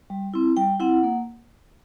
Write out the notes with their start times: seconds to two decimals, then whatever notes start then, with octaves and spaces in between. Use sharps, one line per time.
0.10 G3
0.34 C4 E4
0.57 G3 G5
0.80 C4 E4 F#5
1.03 A#3